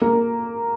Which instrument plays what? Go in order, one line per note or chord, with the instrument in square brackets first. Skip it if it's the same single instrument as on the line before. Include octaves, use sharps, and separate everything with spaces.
[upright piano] A#3